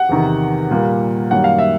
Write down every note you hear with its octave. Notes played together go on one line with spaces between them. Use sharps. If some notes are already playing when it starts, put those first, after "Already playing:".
Already playing: F#5
E2 C3 D#3
A#2 G3 A#3
F#2 D#3 G3 A#3 F#5
F5
E5